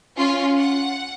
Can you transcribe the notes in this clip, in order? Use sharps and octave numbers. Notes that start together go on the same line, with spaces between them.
C#4 F4
F#5